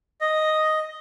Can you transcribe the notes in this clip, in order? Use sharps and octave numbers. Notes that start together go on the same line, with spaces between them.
D#5